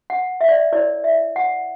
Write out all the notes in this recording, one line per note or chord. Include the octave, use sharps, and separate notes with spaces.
F#5
E5
D5
E5
E4 A#4 C#5 D5
E5
F#5